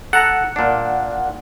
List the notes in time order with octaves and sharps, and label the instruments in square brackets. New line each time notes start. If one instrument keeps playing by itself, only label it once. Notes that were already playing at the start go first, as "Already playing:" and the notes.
[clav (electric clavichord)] A4 A#5 [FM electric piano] F#5
[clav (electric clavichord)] A#2 D4